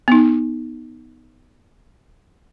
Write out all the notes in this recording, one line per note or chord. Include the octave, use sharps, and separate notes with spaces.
B3 D#4